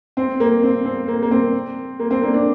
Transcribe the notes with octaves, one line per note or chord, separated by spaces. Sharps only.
C4
A#3
C4
C4
A#3
A#3
C4
A#3
C4
A#3 D4
D4